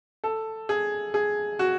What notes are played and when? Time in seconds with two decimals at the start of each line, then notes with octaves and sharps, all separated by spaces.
0.24 A4
0.69 G#4
1.14 G#4
1.59 F#4